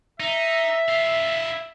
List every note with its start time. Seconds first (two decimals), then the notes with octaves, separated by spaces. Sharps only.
0.20 D#4 E5
0.89 E4 F5